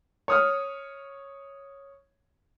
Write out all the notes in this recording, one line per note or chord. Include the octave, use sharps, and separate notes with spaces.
C#5 D#6 F6